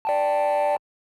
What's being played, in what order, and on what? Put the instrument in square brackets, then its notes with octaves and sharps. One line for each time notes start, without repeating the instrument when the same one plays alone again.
[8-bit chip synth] D5 G5 A5